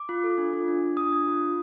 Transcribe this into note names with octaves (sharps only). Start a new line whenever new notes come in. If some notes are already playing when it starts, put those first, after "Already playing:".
Already playing: D6
F4
A4
D4
F4
D4
F4
D4 D#6
D4
F4
F4